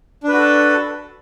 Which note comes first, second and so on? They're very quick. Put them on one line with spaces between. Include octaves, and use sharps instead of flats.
D4 B4 F#4 A4